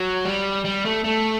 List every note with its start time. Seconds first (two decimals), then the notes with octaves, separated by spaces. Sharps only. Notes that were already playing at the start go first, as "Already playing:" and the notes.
Already playing: F#3
0.25 G3
0.65 G3
0.85 A3
1.04 A3